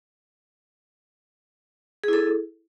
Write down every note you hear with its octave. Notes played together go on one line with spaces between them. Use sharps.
E4 G#4 A4